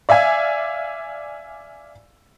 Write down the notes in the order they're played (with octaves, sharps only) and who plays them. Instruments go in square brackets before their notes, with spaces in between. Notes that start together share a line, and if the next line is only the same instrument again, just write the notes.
[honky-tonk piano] D5 E5 F5 G#5